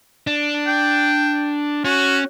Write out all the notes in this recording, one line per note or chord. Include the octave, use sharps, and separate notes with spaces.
D4
G5
C#4 F#4